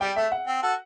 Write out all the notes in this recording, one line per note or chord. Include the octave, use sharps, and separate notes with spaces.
G3 G5
A3 E5
F#5
C4
F#4 A4